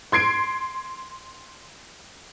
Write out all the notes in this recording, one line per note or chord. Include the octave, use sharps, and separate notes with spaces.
C6 G#6 C7 D7